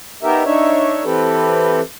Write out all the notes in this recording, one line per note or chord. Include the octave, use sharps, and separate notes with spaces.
B3 D#4 G4 A#4 E5
D4 D#4 C#5 E5
E3 C4 G4 A4 B4